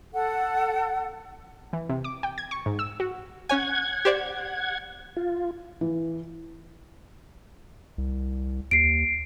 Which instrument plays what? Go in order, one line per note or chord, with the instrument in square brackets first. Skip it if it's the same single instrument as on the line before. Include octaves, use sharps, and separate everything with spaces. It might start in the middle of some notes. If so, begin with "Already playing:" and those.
[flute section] A4 F#5
[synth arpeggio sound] E3
C3
D6
G5
G#6
C#6
G#2
E6
F#4
[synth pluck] C#4 C#5 G#5 [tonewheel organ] F#5 G#6
[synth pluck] G4 C5 D5
[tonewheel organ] F4
[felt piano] E3
[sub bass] C2
[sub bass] D#2 [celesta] C7 D7